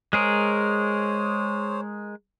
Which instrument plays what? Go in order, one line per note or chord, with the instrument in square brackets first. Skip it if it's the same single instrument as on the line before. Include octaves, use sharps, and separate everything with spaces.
[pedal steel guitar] G#3 G#4 A#4 [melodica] C5 C#5